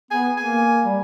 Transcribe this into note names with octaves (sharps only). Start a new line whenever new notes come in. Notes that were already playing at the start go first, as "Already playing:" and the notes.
B3 G#5
A#3 G#5
G3